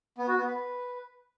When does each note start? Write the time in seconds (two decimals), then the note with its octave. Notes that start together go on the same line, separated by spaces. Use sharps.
0.18 B3
0.28 F#4
0.37 B3
0.47 B4